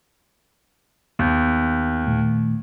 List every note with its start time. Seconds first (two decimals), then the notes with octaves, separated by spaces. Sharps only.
1.19 D#2 B3 G6
2.07 A#2 D#3 A3